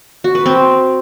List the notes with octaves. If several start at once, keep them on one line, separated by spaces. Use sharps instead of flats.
F#4
B4
C4